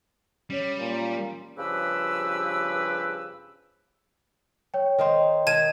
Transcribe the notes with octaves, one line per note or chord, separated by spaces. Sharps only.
G3 C#4 C#5
A#2
G2 C#3 F3 G4 B4 E6
C#5 G5
D#3 D#4 C5
D#3 A5 G#6 D#7